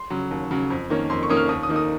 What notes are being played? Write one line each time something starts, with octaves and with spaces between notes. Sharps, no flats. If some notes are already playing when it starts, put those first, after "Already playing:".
Already playing: C6
C#3 F#3
D#2
C#3 F#3
F2
D#3 A#3 C#4
F2 C6
C#6
D#3 A#3 C#4 D#6
F6
D#2 D#6
D#6
D#3 A#3 D#4
D#6